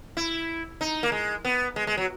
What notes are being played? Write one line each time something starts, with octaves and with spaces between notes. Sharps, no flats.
E4
D#4
A#3
G#3
B3
G#3
G#3
F#3